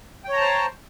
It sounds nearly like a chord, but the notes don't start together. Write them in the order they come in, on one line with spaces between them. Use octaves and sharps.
G5 C#5 A#5 A5 C5